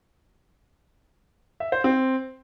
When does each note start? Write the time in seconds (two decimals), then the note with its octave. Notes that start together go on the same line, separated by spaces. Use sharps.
1.60 E5
1.72 C5
1.84 C4